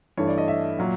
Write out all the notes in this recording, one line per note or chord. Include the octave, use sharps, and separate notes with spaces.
G2 E3 A3 C#5
D5
D#5
E5
A#2 F#3